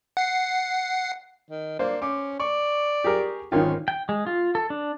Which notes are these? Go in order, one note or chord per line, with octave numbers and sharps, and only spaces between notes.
F#5 C7
D#3
A#3 D4 C5
C#4 D6
D5 C#6
G4 G#4 A#4
G#1 D#3 C#4 F4 G5
G5
G#3
F4
A4
D4